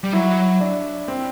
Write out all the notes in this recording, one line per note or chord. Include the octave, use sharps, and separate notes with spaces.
G3
F#3 E4
D4
C4